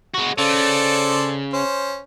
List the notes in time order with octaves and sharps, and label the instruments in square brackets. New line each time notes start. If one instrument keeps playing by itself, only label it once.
[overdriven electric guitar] G#3 F#4
[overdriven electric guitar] C#3 [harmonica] A4 C5 D5
[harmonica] C#4 C5